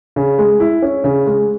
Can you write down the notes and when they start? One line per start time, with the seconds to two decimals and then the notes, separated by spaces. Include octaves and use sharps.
0.16 C#3
0.39 G#3
0.60 E4
0.82 C#4
1.04 C#3
1.26 G#3